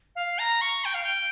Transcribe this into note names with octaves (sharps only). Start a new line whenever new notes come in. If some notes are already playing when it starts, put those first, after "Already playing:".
F5
A#5
C#6
G5
F5
G5